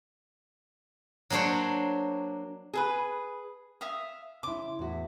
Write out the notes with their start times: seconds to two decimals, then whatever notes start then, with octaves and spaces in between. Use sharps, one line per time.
1.30 F#3 A#3 D4 C5 C#5
2.74 G#4 A4 B4
3.81 E5 F5 D#6
4.43 C#3 E4 C6 D6
4.79 E2 A2 F#4 E5